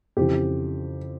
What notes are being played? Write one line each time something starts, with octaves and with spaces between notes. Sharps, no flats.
F2 C#3 E3 G4